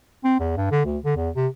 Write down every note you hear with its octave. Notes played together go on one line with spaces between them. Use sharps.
C4
E2
G2
D3
D2
D3
E2
C3